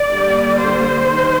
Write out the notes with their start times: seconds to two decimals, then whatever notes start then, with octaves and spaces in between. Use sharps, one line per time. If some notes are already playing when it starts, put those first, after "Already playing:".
Already playing: D5
0.09 D3 G3 A#3
0.60 C5
1.10 D#3